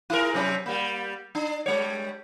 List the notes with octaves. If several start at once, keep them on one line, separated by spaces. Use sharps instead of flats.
E4 G#4 A#4
C3 F#3 C#4
G3 A#3
D4
G3 G#3 C#5